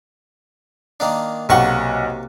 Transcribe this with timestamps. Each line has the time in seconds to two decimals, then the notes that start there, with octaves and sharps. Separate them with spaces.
1.00 D#3 A#3 D4
1.49 B1 C3 A#3 F#5 C#6